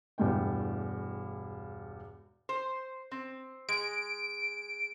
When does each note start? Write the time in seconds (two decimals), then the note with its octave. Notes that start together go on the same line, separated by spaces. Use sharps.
0.18 E1 E2 G2 G3 A3 G5
2.49 C5
3.11 C4
3.69 G#3 D7